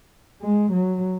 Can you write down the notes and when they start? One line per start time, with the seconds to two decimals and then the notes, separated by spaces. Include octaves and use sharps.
0.42 G#3
0.72 F#3